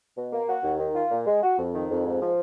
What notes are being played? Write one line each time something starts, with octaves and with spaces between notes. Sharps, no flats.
B2
A#3
F#4
D#2
D#3
F4
A#2
G#3
F#4
F2
D#3
F2
G#2
F3